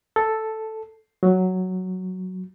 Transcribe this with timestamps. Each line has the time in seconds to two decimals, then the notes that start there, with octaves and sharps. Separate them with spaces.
0.16 A4
1.23 F#3